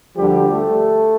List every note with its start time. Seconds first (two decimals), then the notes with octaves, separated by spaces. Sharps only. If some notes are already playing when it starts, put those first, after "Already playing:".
0.16 D2 D3 F3 G3 G4
0.53 A3 A4